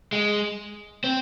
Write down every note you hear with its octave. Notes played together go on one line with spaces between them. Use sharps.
G#3
C4